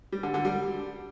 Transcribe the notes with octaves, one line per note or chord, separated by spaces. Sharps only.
G3
D3
D3
G3